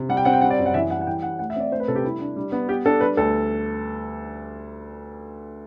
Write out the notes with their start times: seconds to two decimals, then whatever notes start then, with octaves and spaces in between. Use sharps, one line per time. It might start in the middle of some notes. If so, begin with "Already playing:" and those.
Already playing: C3
0.09 G3 F#5
0.17 G5
0.25 C4 F#5
0.33 G5
0.41 G3 F#5
0.50 D5
0.59 F#2
0.66 F#5
0.74 E3 E5
0.90 G3 F#5
1.01 F#5
1.07 E3 G5
1.22 G3 F#5
1.39 A3 F#5
1.50 E5
1.56 C4 D5
1.72 A3 C5
1.80 B4
1.88 C3 A4
1.95 G4
2.04 G3 E4
2.20 D4
2.36 G3
2.52 B3
2.68 B3 G4
2.85 D4 A4
3.01 G3 B4
3.17 D2 A4